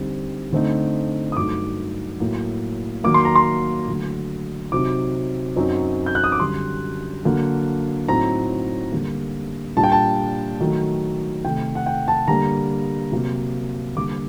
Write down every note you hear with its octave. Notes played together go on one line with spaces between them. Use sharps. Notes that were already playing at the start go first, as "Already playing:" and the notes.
Already playing: D3 G3 C4 D#4
D3 A3 C4 D#4
D#6
G2 F#3 A3 D#4 D6
A2 F#3 A#3
D#3 F#3 A#3 D6
C6
A#5
C6
D3 F#3 A3
C3 F#3 C4 D#4 D6
F#2 F#3 C4 D#4
G6
F#6
D#6
D6
F#2 D3 G3 C6
D3 F#3 A#3 D4
A2 F#3 C4 D#4 A#5
D3 G3 A#3
A#2 G3 D4 A5
G5
A5
D#3 F#3 A3
C3 D#3 A3 G5
F#5
G5
A5
D3 G3 A#3 A#5
C3 F#3 A#3
D3 G3 A#3 D6